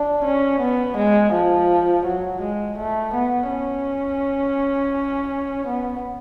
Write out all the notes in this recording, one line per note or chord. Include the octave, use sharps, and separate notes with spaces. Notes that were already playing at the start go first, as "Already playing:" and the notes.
Already playing: D4
C#4
B3
G#3
F3
F#3
G#3
A3
B3
C#4
B3